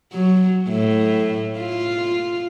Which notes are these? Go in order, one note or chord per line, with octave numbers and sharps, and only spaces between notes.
F#3
A2
F4